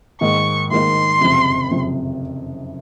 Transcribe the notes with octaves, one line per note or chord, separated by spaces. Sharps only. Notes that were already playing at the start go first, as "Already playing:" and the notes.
G#2 D#3 A#3 D#4 C#6
G#2 D#3 A#3 D#4 C6
F#1 F2 C3
F#1 F2 C3